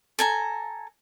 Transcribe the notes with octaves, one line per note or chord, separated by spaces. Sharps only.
A4 G#5 A#5